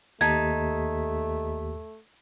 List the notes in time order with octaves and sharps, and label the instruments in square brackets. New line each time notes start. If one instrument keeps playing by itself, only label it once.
[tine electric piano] D#2 G4 B6 [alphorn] A3 [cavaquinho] D#4 A5 [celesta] G#6